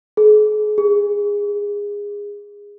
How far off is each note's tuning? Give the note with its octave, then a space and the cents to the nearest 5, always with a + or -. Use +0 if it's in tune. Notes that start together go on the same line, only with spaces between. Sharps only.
G#4 +40
G#4 -20